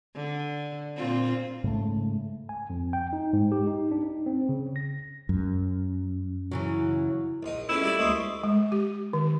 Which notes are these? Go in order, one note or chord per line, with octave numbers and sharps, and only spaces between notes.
D3
A#2 C4 F4
G#2 C#3 A3
G#5
F2
G5
D#4
G#2
G4
D#4
D4
D#4
C4
C#3
A#6
F#2
C#3 E3 F#3
A#1 D#4
C#3 B3 C#4 E4 F4 A4 E5
G3 A4 D5 B5
D2 G#3 A#3 E5 C#6 D#6
G#3
G4
D#3